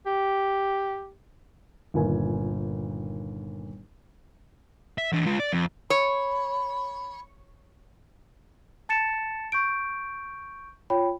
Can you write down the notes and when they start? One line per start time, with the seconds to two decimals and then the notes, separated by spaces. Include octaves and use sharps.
0.06 G4
1.94 G1 D#2 A#2 G#5
4.98 E5
5.13 E3 D4
5.25 G#3 F4
5.40 D5
5.53 F2
5.90 C#5 B5
8.89 A5 A6 C#7 E7
9.52 C#6 G6 D7
10.90 F4 C#5 G5 B5